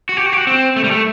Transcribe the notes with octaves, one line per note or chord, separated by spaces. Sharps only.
F#4
G4
F#4
G4
F#4
C4
A3
G3
A3